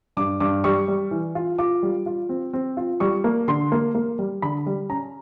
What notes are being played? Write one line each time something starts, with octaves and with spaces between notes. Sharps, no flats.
G2 D6
G2 D6
G3 C#6
G3
E3
F4
F4 D6
G3
F4
C4
C4
F4
G3 C#6
A#3
D3 C6
A#3
A#3
G3
D3 B5
G3
C#4 A#5